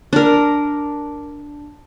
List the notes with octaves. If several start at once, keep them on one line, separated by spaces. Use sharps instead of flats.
D4 A#4